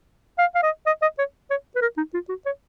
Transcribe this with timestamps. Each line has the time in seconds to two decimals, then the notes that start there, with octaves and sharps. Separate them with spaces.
0.38 F5
0.55 F5
0.63 D#5
0.87 D#5
1.02 D#5
1.19 C#5
1.51 C#5
1.76 B4
1.82 A#4
1.98 D#4
2.14 F4
2.29 F#4
2.46 C#5